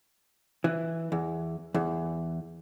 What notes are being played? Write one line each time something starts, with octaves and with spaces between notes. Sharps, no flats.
E3
E2
E2